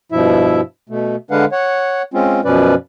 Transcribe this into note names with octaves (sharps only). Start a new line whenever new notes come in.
G2 B2 F3 E4 E5
B2 A3
D3 G#3 D4 B4 F5 F#5
C#5 F#5
G#3 C4 C#4 F4
F#2 B2 F3 C#4 B4 D5